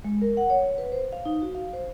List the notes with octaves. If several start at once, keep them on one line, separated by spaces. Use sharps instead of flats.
G#3
A#4
F#5
C#5
B4
C5
F5
D#4
F#4
F5
C5